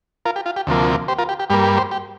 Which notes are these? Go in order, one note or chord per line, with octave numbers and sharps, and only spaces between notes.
F4 A#4
G4
F4
G4
D2 C3 F3 A#3
G4 C5
F4 A#4
G4
G4
G2 G3 A#3 G4
G4
G4 C5
G4